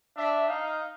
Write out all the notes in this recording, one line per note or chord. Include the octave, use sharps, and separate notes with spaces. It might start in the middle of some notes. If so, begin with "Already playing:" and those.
D4 E5
D#4 F5